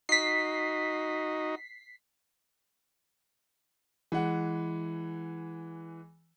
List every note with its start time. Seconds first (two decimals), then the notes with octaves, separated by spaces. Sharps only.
0.09 D#4 F#4 D#5 B6 C7
4.12 E3 G#3 F#5